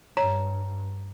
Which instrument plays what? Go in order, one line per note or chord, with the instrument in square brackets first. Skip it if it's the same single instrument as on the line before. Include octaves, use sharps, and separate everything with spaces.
[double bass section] G2 [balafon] C#5 [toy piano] A#5